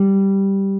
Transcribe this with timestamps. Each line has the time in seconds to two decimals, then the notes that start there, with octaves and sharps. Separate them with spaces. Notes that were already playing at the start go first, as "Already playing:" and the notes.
Already playing: G3